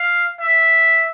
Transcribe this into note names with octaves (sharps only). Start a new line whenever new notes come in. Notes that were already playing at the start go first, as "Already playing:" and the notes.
Already playing: F5
E5